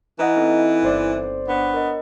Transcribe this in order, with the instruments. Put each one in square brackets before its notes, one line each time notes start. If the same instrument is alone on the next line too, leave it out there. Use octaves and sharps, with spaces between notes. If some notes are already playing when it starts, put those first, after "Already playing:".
[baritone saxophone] E3 [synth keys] E4 D#5 F#5 [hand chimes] B4 A#5
[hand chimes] C4 D#4 A4
[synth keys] G1 C5 D5
[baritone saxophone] B3 [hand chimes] D4 B4 C#5
[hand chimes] A#4 D#5